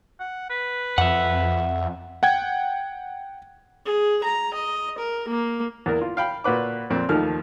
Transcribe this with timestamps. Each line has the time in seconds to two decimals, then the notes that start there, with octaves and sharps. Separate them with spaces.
0.20 F#5
0.50 B4
0.98 F2 E5 F#5
2.23 F#5 G5 G#6
3.86 G#4
4.24 A#5
4.54 D#5
4.99 A#4
5.28 A#3
5.86 E2 A#3 A#4
6.01 F4
6.17 F5 G5 B5
6.44 A#2 F#4 B4 D6
6.90 F2 A#2 C4
7.09 D#2 D#3 F3 A3 F6